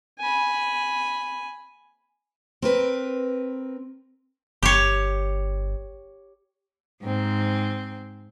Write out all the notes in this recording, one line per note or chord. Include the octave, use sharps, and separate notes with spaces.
G#5 B5
C4 A#4 B4
G1 G4 C#5
G#2 C4